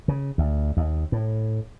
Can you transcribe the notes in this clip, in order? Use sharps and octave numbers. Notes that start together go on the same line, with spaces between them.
C#3
D2
D#2
A2